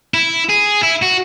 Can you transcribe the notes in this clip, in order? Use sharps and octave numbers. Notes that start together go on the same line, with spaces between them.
E4
G#4
E4
F#4